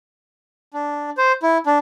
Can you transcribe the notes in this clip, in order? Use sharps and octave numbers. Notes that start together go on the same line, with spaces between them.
D4
C5
E4
D4